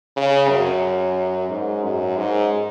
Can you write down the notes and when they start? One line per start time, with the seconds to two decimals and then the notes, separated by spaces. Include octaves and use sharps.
0.16 C#3
0.50 F#2
1.49 G#2
1.84 F#2
2.17 G#2